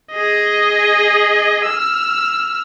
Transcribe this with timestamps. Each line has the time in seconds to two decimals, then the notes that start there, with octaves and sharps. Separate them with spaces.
0.12 G#4 D#5
1.65 E6 F6